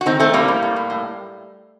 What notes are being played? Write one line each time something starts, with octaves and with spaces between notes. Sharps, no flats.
F#4
D#3 C4 D#4
D#3 A3 C4
A2 G3 A#3
A2
A2
A2
A2